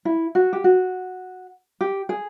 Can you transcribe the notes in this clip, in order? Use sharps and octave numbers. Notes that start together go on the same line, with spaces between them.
E4
F#4
G4
F#4
G4
G#4